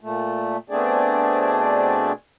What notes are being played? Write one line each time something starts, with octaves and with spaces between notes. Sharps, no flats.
A#2 A3
B2 A3 C4 D4 G#4 D5